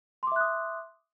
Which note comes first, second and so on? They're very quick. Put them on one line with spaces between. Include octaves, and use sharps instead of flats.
C6 D6 E5 F#6 D#6